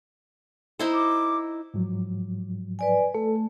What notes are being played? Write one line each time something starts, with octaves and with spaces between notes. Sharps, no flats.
D#4 E4 C5
D6
G#2 F3 F#3
B4 D5 G#5
A3 A4